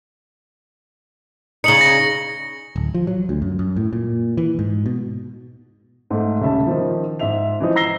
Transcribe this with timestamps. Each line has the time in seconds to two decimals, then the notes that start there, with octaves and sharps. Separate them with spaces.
1.64 C#3 D#4 C#7 F#7 G7
1.81 A#6
2.76 D1
2.94 F3
3.07 F#3
3.29 D2
3.42 F#2
3.59 F#2
3.76 A2
3.93 A#2
4.37 E3
4.59 G#2
4.86 B2
6.10 G#2 A3
6.40 D#1 C#3 C#4 E5 A5
6.67 D#3 F3
7.19 G#2 E5 F7
7.60 E3 F3 D#4
7.76 A#5 E6 A#6 C7 G7